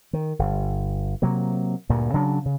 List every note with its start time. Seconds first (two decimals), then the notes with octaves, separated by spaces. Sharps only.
0.13 D#3
0.39 G1
1.22 C3 F#3 A#3
1.89 D2 G2 A#2
2.14 C#3 F#3 D4
2.45 C#3